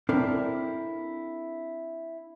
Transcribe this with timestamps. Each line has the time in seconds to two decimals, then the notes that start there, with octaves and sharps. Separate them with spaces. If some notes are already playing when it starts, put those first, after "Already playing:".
0.09 C4 D4 E4 A4 A#4